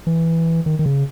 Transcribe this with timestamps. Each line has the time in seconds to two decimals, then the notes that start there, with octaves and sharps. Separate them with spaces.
0.07 E3
0.66 D#3
0.79 D#3
0.86 C#3